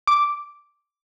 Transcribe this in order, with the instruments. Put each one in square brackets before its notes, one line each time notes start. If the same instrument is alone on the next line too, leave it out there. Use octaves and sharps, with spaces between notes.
[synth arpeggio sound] D6